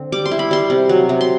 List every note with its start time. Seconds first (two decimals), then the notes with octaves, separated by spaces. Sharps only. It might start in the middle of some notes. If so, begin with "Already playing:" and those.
Already playing: D3 C4
0.12 G3 D6
0.25 C6
0.32 E4
0.39 B5
0.51 G3 C6
0.70 C3
0.89 F#3
1.09 C3
1.21 C6